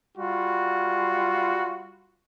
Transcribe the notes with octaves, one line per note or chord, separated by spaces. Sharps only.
G3 F4 F#4